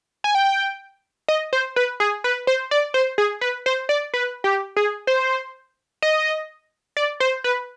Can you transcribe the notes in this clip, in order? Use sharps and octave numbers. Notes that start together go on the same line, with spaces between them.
G#5
G5
D#5
C5
B4
G#4
B4
C5
D5
C5
G#4
B4
C5
D5
B4
G4
G#4
C5
D#5
D5
C5
B4